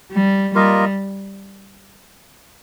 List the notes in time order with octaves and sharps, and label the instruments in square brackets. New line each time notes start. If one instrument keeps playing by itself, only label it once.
[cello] G3
[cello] G3 [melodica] A#3 F4 A#4 D#5